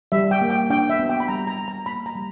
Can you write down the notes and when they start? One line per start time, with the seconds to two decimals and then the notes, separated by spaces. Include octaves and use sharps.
0.12 G3 E5
0.31 G5
0.41 A#3
0.50 G5
0.70 D4 G5
0.90 E5
0.99 B3
1.09 G5
1.20 B5
1.28 G3 A#5
1.47 A#5
1.58 G3
1.68 A#5
1.86 A#3 B5
2.06 A#5
2.15 G3